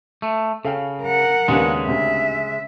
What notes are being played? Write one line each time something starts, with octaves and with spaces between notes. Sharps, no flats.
A3
C#3 A4 F5 G5
A#4 F#5
D#2 C#3 G#3 B3 D4
D2 C3 E5